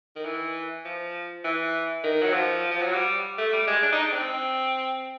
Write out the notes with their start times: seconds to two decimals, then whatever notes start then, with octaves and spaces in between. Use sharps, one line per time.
0.16 D#3
0.25 E3
0.85 F3
1.44 E3
2.04 D#3
2.22 F#3
2.33 F3
2.71 F3
2.82 F#3
2.93 G3
3.38 A3
3.53 G3
3.67 G#3
3.83 D4
3.92 D#4
4.02 D4
4.12 C4